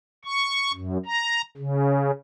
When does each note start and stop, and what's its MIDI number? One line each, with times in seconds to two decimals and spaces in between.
0.25 0.72 85
0.73 0.97 42
1.06 1.42 82
1.58 2.11 49